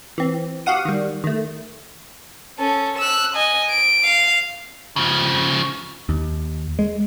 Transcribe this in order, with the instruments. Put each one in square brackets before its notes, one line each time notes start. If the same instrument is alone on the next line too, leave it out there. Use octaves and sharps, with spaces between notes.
[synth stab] E3 C4
F#4 G4 F5 F#5 D#6
D#3 G3
D#3 A3
[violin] C#4 A4
E6 F#6
D#5 G#5
D7
F5
[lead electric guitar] C#3 F3
[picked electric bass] D#2
G#3